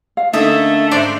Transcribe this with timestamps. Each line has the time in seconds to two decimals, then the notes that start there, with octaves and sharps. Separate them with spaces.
0.17 F5
0.33 D3 A3 A#3 C#4 D#4 E5 D#6
0.91 G#2 D4 C5 D5 A#5